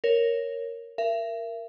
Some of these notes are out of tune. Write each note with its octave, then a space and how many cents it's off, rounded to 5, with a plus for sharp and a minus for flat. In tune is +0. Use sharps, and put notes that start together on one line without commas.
A#4 +0 C#5 +0
A#4 +0 E5 +35